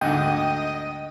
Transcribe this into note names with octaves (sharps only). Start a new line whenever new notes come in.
D2 G#2 D3 D#5 G5